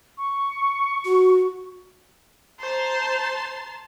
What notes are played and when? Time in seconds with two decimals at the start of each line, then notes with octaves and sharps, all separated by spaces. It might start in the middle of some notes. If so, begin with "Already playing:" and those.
0.18 C#6
1.05 F#4
2.60 C5 A5 A#5 C6